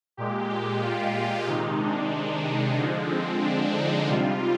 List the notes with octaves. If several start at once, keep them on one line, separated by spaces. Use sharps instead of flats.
A#2 G#3 G4
G4
F4
C3 D#3 G#3 D#4
D4
D3 F3 G#3
C4
D4
D#4
C3 G3 F4